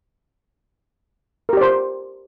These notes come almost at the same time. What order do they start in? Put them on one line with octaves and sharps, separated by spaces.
A#4 G4 D5 C5